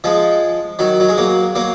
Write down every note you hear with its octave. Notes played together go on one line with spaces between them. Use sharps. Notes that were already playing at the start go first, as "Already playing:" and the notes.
F3 G#3
D#3 F#3
F#3
G#3
F#3 A#3
F#3 A#3